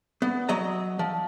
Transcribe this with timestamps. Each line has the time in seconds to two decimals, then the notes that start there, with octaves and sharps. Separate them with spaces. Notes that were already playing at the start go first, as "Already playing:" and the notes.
0.22 B3
0.49 F#3 D#5 A#5
0.99 F3